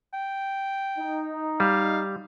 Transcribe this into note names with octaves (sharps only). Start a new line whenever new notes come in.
G5
D#4
G3 F5